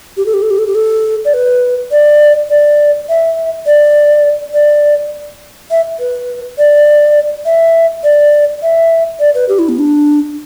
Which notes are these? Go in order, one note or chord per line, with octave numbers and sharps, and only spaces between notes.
G4
A4
G4
A4
G4
A4
G4
A4
D5
B4
D5
D5
E5
D5
D5
E5
B4
D5
E5
D5
E5
D5
B4
G4
E4
B3
D4